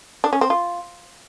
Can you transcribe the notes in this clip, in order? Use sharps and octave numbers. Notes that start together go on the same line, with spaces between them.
D4
C#4
C4
F4